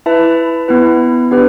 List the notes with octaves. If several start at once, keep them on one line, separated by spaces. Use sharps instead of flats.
E4 B4 E5 A5
B3 E4 B4
B3 D4 G4 B4